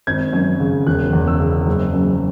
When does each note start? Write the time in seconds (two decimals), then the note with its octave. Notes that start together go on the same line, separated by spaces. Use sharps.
0.07 G#1 G#6
0.33 F#2
0.60 C#3
0.87 E1 F#6
1.13 E2
1.27 E6
1.40 C#3
1.66 F#1
1.94 F#2